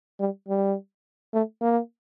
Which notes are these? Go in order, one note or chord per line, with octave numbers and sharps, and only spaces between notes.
G3
G3
A3
A#3